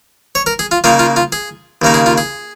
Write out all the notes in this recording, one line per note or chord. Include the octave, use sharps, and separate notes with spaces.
C#5
A#4
G#4
F4
C#3 A#3 D#4 F4
F4
F4
G#4
D#2 C#3 A#3 D#4
G#4
F4
G#4